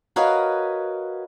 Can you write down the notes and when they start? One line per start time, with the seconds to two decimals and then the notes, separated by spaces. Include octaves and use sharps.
0.16 F#4 A#4 B4 C#5 D#5 F5